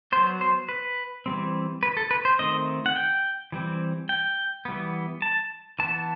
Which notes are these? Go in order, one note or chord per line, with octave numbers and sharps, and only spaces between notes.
F#3 B3 C5
C5
B4
E3 G3 C4
B4
A4
B4
C5
D#3 A3 C4 D#5
F#5
G5
E3 G3 C4
G5
E3 G3 B3
A5
E3 B3 A5